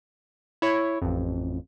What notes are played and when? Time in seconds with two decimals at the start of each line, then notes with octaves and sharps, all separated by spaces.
0.62 E4 C#5
1.02 A1 F2